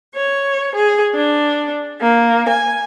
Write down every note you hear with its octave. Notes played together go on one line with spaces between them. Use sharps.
C#5
G#4
D4
A#3
G#5